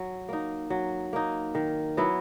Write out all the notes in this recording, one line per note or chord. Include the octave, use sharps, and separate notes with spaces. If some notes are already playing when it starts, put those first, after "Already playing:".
Already playing: F#3
A#3 D#4
F#3
A#3 D#4
D#3
F#3 B3 E4